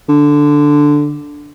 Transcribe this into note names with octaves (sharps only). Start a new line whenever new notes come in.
D3